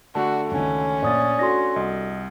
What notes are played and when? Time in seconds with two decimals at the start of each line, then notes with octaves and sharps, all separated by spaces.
0.15 D3 A3 D4 F#4 A4 A5
0.51 C#2 D#3 C#4
1.02 A#1 D5 D#6 A6
1.39 D4 F#4 A4 C6 A#6
1.76 C2 D#5